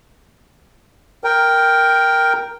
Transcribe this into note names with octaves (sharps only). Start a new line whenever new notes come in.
A#4 G5